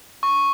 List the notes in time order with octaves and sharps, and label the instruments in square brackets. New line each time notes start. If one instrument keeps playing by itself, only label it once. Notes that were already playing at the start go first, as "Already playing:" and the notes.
[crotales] C#6